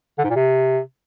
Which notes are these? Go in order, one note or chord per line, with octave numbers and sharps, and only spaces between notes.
D3
G#2
A#2
C3